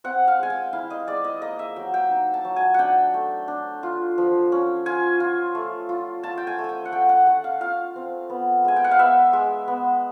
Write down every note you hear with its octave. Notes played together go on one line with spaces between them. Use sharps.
C4 F#5
F5
G#3 G#5
G5
E4 F5
D#5
G#3 D5
D#5
A#3 D#5
E5
F#3 G5
G5
D#4
A5
F#3
G#5
D4 F#5 G5
A3
D4
F4
F3
C#4
F4 G#5
F4
A3
F4
F4 A5
G5
G#5
A3
G5 G#5
F#5
A3 G5
F#5
A3 F#5
F5
F4 F5
C4
B3
G#3 G#5
G5
F#5
F5
B3 E5
G#3
B3